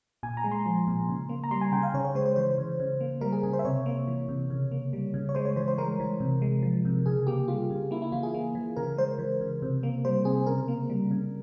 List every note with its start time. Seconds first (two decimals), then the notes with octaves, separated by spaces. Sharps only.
0.23 A#2 G#5
0.37 A#5
0.44 G#3
0.52 C6
0.66 F3
0.87 A#2
1.09 C#3
1.29 A#3
1.44 A#5
1.51 G3 C6
1.61 G#5
1.72 C#3 G5
1.83 F5
1.94 C#3 C#5
2.05 C#5
2.15 G#3 C5
2.26 C5
2.36 E3 C5
2.58 C#3
2.80 C#3
3.01 A#3
3.21 G3 A#4
3.32 G#4
3.43 C#3 G#4
3.53 C5
3.59 E5
3.65 C3 C#5
3.86 A#3
4.08 E3
4.28 C3
4.50 C#3
4.72 A#3
4.93 G3
5.14 C#3
5.29 C#5
5.35 G#3 C5
5.45 C#5
5.56 E3 C5
5.68 C5
5.78 G#3 A#4
6.00 E3
6.20 C3
6.42 G#3
6.63 F3
6.85 C3
7.06 C#3 G#4
7.27 A#3 G4
7.48 G3 F4
7.70 C#3
7.91 A#3 E4
8.02 E4
8.12 E3 F4
8.23 G#4
8.34 A#3
8.55 E3
8.76 C#3 A#4
8.97 G#3 C5
9.19 E3
9.41 C#3
9.62 C3
9.83 A#3
10.05 G3 C5
10.25 C3 G#4
10.47 C#3 A#4
10.68 A#3
10.90 G3
11.11 C#3